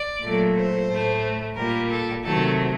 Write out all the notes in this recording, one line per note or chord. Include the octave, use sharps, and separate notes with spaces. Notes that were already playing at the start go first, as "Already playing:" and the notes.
Already playing: D5
A#2 F#3 A3
C5
A2 A3
A#2 G3 A#4
A4
C3 D#3 F#3 A3 A4